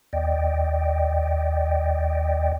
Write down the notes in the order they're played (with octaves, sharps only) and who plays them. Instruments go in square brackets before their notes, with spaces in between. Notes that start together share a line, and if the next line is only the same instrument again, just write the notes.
[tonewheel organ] D#2 D5 D#5 G5